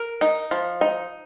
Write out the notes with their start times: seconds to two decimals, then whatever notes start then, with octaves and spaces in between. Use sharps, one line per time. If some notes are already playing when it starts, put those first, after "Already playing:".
Already playing: A#4
0.21 D#4
0.51 F3
0.81 D#4